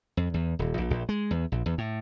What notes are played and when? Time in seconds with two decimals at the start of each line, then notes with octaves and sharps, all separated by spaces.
0.17 F2
0.34 E2
0.59 D#1
0.78 A#1
0.91 A#1
1.09 G#3
1.31 E2
1.52 A#1
1.66 E2
1.78 A2